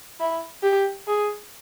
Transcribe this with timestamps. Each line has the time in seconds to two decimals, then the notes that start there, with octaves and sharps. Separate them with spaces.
0.20 E4
0.63 G4
1.07 G#4